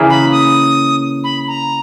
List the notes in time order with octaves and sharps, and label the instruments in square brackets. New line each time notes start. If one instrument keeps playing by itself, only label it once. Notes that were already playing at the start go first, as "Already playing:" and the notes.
Already playing: [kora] C#3 E3 A#3
[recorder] B5
D#6
B5
A#5